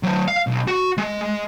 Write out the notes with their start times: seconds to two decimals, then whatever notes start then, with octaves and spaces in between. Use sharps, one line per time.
0.03 F#3 C5
0.28 F5
0.47 B1
0.68 F#4
0.98 G#3